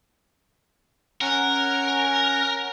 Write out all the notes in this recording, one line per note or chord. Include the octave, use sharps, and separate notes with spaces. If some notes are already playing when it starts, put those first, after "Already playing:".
C#4 A#4 F#5